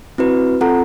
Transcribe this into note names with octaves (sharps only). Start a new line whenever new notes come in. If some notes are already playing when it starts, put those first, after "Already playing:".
C4 E4 F#4 B4
C4 F4 A4 F#5 A#5